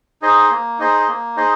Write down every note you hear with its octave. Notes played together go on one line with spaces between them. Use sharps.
D#4 G#4 C5 D#5
A#3
D#4 G#4 C5 D#5
A#3
D#4 G#4 C5 D#5